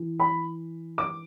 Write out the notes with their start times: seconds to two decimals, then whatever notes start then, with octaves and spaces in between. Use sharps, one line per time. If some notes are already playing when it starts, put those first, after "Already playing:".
Already playing: E3
0.20 B5
0.98 D6